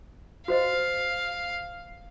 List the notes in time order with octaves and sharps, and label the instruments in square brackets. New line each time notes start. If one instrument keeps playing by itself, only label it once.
[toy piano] F#4 C5 D#5 [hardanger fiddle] F5